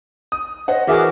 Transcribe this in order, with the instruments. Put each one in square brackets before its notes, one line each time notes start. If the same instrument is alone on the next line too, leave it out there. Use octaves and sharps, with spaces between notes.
[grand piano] D#6
[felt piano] C5 C#5 F#5 [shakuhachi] D#5
[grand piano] E3 E5 [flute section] F#4 G#4 D6 [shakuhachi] A#4